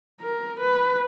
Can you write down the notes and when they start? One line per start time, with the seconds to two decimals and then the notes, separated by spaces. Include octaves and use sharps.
0.20 A#4
0.60 B4